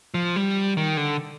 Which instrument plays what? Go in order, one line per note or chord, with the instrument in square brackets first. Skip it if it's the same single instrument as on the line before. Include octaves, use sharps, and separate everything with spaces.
[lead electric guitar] F3
G3
D#3
D3